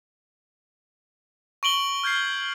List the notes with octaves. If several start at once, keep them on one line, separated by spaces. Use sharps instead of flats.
C#6 D7 F#7 G7
F6 G6 G#6 C7